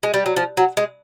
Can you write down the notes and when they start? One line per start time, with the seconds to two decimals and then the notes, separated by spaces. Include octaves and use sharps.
0.03 G#3
0.14 G3
0.26 F#3
0.36 F3
0.57 F#3
0.77 G#3